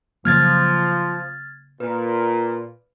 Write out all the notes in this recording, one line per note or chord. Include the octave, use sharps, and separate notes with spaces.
C#3 F3 F#3 A#3 F6 G#6 A6
A#2 B4